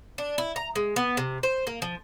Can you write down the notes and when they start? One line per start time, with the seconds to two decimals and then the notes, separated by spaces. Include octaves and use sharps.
0.18 D4
0.38 E4
0.56 A#5
0.76 G#3
0.96 B3
1.17 C3
1.43 C5
1.67 A#3
1.82 F3